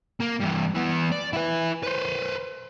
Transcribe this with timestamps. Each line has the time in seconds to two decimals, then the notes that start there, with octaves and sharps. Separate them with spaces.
0.21 A#3
0.40 G2 E3
0.75 E3 B3
1.12 D5
1.33 E4 B4
1.83 B4 C5